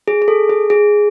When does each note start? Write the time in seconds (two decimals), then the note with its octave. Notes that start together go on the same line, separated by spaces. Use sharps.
0.08 G#4
0.22 G#4
0.28 A4
0.50 G#4
0.70 G#4